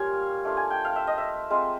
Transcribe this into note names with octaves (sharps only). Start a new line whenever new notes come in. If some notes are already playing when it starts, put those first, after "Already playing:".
Already playing: G3 A#3 C#4 F4 F5 G#5
A3 D4 F4
G#5
G5
F5
E5
D#5
E5
G#3 C4 F4